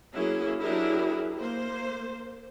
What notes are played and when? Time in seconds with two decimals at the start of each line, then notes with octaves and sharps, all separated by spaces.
0.14 F#3 A#3 C#4 E4 G#4
0.60 F#3 D4 E4 G4 G#4 A#4
1.38 A#3 C5